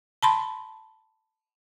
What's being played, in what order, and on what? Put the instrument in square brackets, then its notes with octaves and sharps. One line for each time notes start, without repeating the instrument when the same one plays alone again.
[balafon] A5 B5 C6